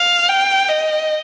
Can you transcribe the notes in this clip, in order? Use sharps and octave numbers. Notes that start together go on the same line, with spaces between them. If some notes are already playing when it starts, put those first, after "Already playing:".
Already playing: F5
G5
D#5